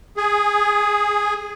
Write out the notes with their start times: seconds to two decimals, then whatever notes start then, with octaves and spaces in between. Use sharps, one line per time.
0.17 G#4